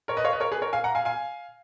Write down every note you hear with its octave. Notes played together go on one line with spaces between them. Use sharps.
A#4 C#5
B4 D#5
C#5 F5
B4 D#5
A#4 C#5
G#4 B4
A#4 C#5
F5 G#5
F#5 A#5
F5 G#5
F5 G#5